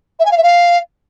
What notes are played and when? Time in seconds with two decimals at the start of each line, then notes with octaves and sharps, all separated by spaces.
0.19 E5
0.25 G#5
0.31 F5
0.37 E5
0.43 F5